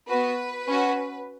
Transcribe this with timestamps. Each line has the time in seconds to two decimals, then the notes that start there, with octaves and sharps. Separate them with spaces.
0.08 B3 F#4 B4
0.68 C#4 F#4